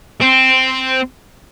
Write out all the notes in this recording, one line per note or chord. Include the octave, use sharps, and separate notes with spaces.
C4